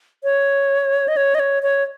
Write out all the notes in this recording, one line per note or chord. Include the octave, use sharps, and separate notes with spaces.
C#5
D#5
C#5
D#5
C#5
C#5